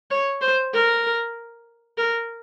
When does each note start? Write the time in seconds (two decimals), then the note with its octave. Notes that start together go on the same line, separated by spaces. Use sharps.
0.11 C#5
0.42 C5
0.74 A#4
1.98 A#4